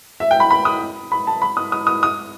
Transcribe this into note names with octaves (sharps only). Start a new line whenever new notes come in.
E5
G5
B5
B5
D#6
B5
A5
B5
D#6
D#6
D#6
D#6